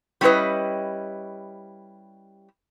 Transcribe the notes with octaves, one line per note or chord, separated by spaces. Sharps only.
G3 C#4 E4 G4 B4 D#5